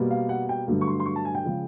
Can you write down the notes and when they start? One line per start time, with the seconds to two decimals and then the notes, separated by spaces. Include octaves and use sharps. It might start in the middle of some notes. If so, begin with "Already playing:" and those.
Already playing: B2 G3 A#3
0.11 F5
0.29 F#5
0.49 G5
0.68 G2 D3 F#3 A3
0.81 C#6
0.87 C6
1.00 C6
1.06 C#6
1.16 A5
1.25 G#5
1.35 G5
1.44 C#3 F3 G#3